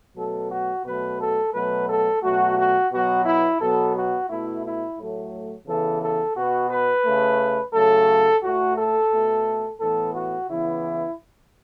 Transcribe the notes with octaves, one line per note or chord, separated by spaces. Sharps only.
B2 F#3 A3 A4
F#4
B2 F#3 A3 B4
A4
B2 F#3 A3 B4
A4
B2 F#3 A3 F#4
F#4
B2 F#3 B3 F#4
E4
B2 F#3 B3 A4
F#4
B2 A3 E4
E4
A2 F#3 A3
C#3 E3 B3 A4
A4
B2 B3 F#4
B4
C#3 A3
C#3 F#3 A3 A4
A2 A3 F#4
A4
B2 A3
A2 E3 B3 A4
F#4
C#3 E3 B3 E4